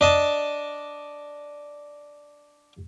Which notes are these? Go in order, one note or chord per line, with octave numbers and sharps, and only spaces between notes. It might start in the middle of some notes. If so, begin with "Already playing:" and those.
D4 D#5 A5